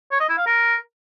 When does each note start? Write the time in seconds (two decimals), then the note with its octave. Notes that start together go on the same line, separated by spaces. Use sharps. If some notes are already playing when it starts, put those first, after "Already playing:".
0.12 C#5
0.20 D#5
0.29 E4
0.38 F5
0.47 A#4